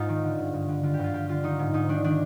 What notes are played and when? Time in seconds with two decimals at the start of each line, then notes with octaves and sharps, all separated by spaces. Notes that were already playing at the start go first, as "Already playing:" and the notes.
Already playing: G#2 D#4 F4
0.09 D#3
0.23 D3
0.39 G2
0.53 G2
0.69 D3
0.83 D3 F4
0.94 G4
0.99 G2 F4
1.14 G2 G4
1.29 D3 F4
1.43 D#3 D#4
1.59 G#2
1.74 G#2 D#4
1.89 D#3 D4
2.04 D#3 D4